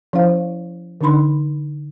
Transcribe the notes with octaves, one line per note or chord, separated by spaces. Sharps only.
F3 C#4 E4 C5 F5
D3 E3 D4 D#4 B5 C6